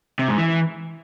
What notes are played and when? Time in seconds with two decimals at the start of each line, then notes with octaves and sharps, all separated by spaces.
0.19 C3
0.29 G#2
0.38 E3